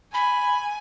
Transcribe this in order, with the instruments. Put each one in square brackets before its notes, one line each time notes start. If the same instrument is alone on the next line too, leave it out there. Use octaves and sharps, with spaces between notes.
[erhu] G#5 [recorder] B5